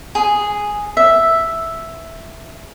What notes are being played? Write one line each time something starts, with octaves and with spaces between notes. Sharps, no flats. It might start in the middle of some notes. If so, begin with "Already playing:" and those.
G#4
E5